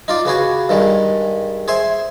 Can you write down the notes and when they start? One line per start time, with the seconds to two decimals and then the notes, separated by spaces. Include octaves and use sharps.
0.08 D#4 F4 D5
0.25 C#3 B3 F#4 G#4
0.69 G2 D#3 G#3
1.68 G#4 C5 E5